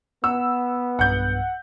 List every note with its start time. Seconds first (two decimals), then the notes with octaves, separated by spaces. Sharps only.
0.24 B3 F#5 E6
0.99 B1 G2 F#5 G6